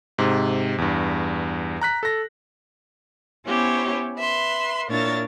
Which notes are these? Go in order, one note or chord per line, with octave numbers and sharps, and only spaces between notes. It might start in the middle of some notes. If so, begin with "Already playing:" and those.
G#2 C3
E2 G2
A#5 F#6 B6
A4 A#6
B3 C#4 E4 G4 C5 C#5
B4 E5 C6
A#2 D4 E4 A#4 C#5 A6